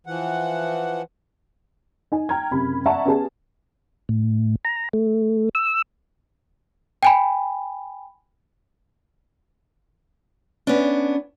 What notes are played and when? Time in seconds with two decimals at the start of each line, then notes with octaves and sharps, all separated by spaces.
0.07 E3 F3 F#5
2.12 D#4 G#5
2.29 G5 A#5 F6 G#6
2.51 F#1 C3 B5
2.86 D5 E5 F#5 A5 A#5 C#6
3.05 B3 C#4 G4 G#4 A5
4.09 A2
4.65 A#5
4.93 A3
5.55 E6
7.03 G5 G#5 B5
10.67 B3 C#4 D4